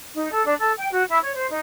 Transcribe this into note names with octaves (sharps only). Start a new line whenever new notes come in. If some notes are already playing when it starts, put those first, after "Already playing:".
D#4
A4
D4
A4
G5
F#4
E4
C#5
C5
D#4